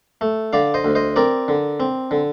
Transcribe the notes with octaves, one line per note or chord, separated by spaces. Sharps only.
A3
D3 D5 F5
C5 D#5
D2
C5 D#5
C4 A#4 D5
D3
C4
D3